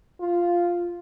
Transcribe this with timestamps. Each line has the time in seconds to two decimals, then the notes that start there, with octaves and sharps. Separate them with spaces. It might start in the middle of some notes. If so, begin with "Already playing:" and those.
0.21 F4